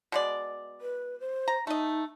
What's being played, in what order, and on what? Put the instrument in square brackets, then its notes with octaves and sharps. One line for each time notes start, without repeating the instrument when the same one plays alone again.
[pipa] B2 G#3 D5
[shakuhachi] B4
C5
[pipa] A#5
[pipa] A3 D#5 [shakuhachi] D#4